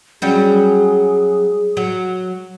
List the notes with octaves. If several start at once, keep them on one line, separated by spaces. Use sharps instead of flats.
F#3 G3 C#4 G#4
F#3